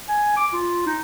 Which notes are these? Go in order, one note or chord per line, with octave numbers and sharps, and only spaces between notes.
G#5
D6
F4
D#4